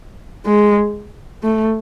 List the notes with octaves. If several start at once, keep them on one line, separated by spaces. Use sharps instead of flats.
G#3
A3